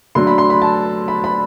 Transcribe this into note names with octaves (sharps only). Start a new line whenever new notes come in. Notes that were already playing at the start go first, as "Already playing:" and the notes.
D3 F#3 A3 C6
B5
C6
B5
A5
B5
B5